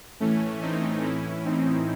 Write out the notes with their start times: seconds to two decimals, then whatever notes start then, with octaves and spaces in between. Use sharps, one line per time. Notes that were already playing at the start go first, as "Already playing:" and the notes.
0.20 A2 E3 A3 C#4
0.62 C4 D#4
1.03 A2 E3 C#4 E4
1.45 C4 D#4